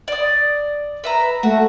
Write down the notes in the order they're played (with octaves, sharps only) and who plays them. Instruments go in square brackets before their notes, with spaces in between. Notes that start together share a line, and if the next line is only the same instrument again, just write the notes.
[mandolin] D5 D#6
B4 E5 A#5
[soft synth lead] A3 [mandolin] F#4